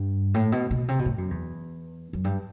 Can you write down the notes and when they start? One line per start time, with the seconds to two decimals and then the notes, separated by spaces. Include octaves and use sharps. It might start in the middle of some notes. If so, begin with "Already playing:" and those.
Already playing: G2
0.34 A2
0.52 B2
0.71 B2
0.88 C3
0.99 B2
1.06 A2
1.18 F#2
1.31 E2
2.13 F#2
2.24 G2